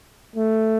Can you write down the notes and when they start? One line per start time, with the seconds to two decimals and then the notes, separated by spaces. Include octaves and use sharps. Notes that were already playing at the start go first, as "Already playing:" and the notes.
0.36 A3